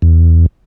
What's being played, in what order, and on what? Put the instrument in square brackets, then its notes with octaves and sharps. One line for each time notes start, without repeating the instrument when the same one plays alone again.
[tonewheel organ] E2